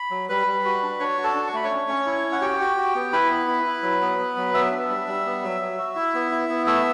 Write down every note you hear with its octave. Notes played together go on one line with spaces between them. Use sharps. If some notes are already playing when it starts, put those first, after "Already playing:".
Already playing: B5
F#3
G3 B4 B5
G3
F#4
D4
D4 C#5 C#6
F#4
A4 A5
D4
C#6
A3 B5
C#5 C#6
C#4
C#4
E4
C#4
F#5
F#4 G4 G5
F#4
F#4
B3
E4 B4 B5
B3
E4
E4
F#3
B3
B3
F#3
B3 E5 E6
D4
G3
G3
B3
F#3
F#3
F#4
E4
B3
E4
B3
A3 E5 E6